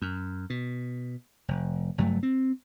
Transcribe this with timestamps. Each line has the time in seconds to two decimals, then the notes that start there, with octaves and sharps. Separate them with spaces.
0.02 F#2
0.50 B2
1.48 F1
1.98 F#1 G2 F#3 A3
2.23 C4